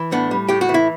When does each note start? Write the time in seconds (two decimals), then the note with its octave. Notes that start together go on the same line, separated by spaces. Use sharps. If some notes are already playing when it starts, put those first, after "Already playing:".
Already playing: E3
0.12 A2 B3 D4
0.31 G3
0.49 A2 G4
0.61 F#4
0.69 E3
0.74 E4